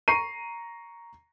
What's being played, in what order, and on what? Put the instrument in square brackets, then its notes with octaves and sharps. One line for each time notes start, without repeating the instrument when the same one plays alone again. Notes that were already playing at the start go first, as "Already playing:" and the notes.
[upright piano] A#5 C#6 C7 D#7